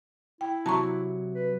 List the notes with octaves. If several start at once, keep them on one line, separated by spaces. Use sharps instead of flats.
E4 G5
C3 F#3 A5 A#5 C#6
B4